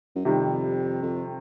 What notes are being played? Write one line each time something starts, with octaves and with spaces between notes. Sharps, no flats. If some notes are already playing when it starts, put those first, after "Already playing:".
F#2
F2 C3 D#3 G3
F2